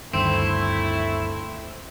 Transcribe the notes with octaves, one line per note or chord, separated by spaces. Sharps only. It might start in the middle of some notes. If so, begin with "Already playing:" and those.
D2 G2 D#3 A3 C4 E4